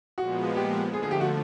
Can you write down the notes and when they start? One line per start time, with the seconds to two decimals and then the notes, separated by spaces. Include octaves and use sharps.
0.18 A#2 F3 G#3 B3 F#4
0.56 G4
0.93 D3 F3 A3 G#4
1.03 G#4
1.11 G4
1.21 F#4